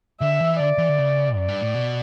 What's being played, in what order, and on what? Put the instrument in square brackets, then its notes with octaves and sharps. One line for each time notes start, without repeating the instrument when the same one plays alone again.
[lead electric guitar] D3 [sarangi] E5
[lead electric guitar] E3
[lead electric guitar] D3 [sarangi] D5
[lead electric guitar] E3
D3
C#3
[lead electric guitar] F#2 [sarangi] D5
[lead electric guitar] G2
A2
B2